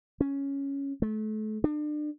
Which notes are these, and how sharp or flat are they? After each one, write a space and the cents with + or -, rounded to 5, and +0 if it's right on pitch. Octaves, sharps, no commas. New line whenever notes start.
C#4 +0
A3 -35
D4 +35